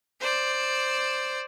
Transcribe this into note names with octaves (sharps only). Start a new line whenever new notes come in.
C5 D5